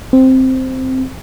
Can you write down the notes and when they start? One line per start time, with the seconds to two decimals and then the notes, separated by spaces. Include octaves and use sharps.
0.13 C4